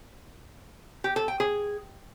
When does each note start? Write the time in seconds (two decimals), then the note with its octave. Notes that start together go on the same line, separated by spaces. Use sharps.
1.04 G4
1.16 A4
1.28 G5
1.40 G#4